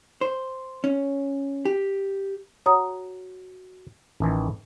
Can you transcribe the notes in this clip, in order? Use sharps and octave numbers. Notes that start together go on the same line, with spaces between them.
C5
C#4
G4
F#4 C#5 A#5 D#6
A1 D#3 E3